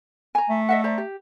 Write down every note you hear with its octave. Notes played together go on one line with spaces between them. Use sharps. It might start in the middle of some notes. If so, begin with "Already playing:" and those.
G#5 A#5
A3
D#5 E5 F#5
C5 D5 A#5
G4